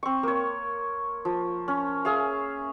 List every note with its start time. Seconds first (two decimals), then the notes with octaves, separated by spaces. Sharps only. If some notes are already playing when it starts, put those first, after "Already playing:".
0.03 C4 C#6
0.23 A#3 C#5
1.25 F3
1.68 C#4
2.05 G#4 E5 F5